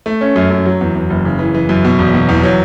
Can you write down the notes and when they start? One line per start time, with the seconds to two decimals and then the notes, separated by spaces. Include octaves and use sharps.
0.06 A3
0.21 C#4
0.36 F#2
0.51 F#2
0.65 F#3
0.81 E2
0.95 E2
1.10 F#1
1.25 C#3
1.39 E3
1.55 E3
1.69 F#2
1.85 B2
1.99 E1
2.14 B2
2.29 E2
2.43 F#3